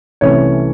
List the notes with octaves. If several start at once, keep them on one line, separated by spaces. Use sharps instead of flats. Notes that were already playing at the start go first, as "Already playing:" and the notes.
C2 C3 E3 A3 C#4 C#5